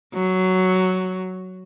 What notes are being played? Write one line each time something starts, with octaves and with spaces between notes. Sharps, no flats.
F#3